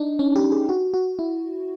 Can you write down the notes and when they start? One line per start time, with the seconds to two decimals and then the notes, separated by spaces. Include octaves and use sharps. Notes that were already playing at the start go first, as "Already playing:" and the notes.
Already playing: D4 D#4
0.19 C#4
0.36 G4
0.52 G#4
0.69 F#4
0.94 F#4
1.19 E4